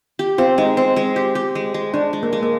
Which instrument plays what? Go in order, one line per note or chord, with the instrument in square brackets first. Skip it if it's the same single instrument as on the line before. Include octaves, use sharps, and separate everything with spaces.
[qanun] G4
[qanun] C4 [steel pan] F4
[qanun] G#3 [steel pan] D#4
[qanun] C4
G#3
G4
G4
G#3
G#3
[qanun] G#3 [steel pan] D4
[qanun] G#3
[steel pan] A#3
[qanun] G#3
[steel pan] A#3